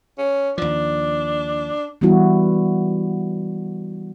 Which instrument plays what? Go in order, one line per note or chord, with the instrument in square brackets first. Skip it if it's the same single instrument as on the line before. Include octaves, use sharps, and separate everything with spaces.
[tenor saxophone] C#4
[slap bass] D#2 F3 [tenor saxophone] D4
[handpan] E3 G3 B3 E4 F#4